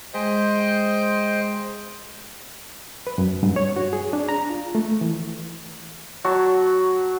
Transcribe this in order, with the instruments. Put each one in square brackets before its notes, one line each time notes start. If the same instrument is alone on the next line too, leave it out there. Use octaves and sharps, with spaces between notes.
[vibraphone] G#3 G#4 [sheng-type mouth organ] C5 D#5 G5
[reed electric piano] B4
F#2
G2
C#5
F#4
G#4
D4
A#5
F4
A3
E3
[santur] F#3 F#4 C#5 A5